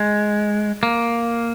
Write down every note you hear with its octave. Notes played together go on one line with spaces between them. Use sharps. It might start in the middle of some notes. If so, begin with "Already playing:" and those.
Already playing: G#3
A#3